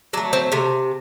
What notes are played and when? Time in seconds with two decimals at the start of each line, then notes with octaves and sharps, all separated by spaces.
0.13 F#3 D4
0.17 A3
0.33 C4
0.52 C3 A3